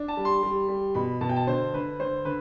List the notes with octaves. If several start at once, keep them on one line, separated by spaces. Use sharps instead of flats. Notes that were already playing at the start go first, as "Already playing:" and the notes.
Already playing: D4
A5
G3
C6
G3
G3
B2 B5
B2 A5
G5
A5
D3 C5
D3 B4
D3 C5
D3 B4